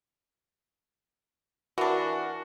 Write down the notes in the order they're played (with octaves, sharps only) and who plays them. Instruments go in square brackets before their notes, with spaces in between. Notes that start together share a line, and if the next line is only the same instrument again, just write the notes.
[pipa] E3 D4 [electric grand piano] F#4 [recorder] A#4